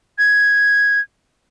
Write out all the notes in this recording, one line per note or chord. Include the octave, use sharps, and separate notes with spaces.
G#6